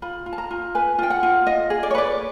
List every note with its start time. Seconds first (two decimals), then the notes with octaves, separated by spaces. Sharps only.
0.02 F4 B5
0.26 F4
0.33 A5
0.38 A#5
0.51 F4
0.75 B4 G#5
0.98 F4 G5
1.10 F#5
1.23 F4
1.47 F4 D#5
1.70 G#4
1.83 D5
1.91 C#5
1.95 B4 D5